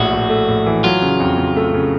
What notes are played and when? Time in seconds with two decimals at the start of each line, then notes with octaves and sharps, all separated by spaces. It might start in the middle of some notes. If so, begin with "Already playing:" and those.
Already playing: A#1 A2 F#4
0.12 A#1
0.30 A3
0.48 A2
0.66 E3
0.84 F#3 F4
1.02 C#3
1.20 F2
1.37 C#3
1.56 A3
1.74 C#3